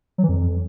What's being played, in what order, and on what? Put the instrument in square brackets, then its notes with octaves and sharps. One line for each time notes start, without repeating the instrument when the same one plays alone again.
[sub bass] F#3
E3
F2